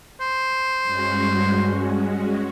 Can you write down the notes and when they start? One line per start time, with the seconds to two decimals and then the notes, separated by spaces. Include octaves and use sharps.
0.21 C5
0.85 G2 G#3 C#4 F#4